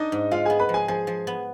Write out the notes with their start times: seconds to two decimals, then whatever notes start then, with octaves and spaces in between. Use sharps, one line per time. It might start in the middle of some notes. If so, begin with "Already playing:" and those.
Already playing: D4 D#4 D#5
0.12 G#2
0.31 G#3 F4 F5
0.45 B3 G#4 G#5
0.59 B4 B5
0.69 F3
0.74 G#4 G#5
0.88 F3 G#4 G#5
1.07 F3
1.27 B3